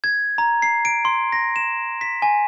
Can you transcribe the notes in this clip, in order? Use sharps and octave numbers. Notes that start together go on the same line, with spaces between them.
G#6
A#5
C7
D7
C6
A#6
E7
B6
G#5